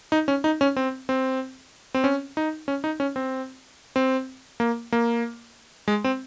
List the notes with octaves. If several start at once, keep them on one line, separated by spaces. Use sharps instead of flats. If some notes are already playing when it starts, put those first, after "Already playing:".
D#4
C#4
D#4
C#4
C4
C4
C4
C#4
D#4
C#4
D#4
C#4
C4
C4
A#3
A#3
G#3
C4